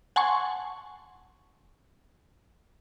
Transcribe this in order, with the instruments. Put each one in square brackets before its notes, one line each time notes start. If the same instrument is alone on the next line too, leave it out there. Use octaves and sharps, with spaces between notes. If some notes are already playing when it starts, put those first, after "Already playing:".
[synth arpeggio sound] F#5 G#5 A5 C6 C#6